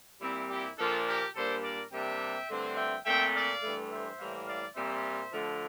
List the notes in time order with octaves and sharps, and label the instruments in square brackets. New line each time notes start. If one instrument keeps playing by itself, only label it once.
[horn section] A#2 G3 C4 E4
E4 G4
A#2 F3 A#3 D4 F4 A4
G4 A#4
A#2 G3 A#3 D4 A4 C5
A#4 D5
C3 G3 A#3 D4 E5 G5
G2 D3 A3 C4
E5 G5
A#2 A3 C4 E5 G5
D5 F5
G2 E3 A3
C5 E5
A2 E3 G3 A#3
D5 F5
A#2 G3 C4 C5 E5
D3 F3 A3